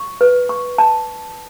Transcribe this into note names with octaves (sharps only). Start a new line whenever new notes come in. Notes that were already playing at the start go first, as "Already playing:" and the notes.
Already playing: C#6
B4
C#6
A5